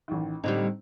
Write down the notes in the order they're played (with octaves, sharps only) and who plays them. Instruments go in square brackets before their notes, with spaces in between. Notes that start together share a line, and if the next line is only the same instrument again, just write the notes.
[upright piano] A1 D#3
[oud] A2 D3 G3 [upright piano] C4 D#4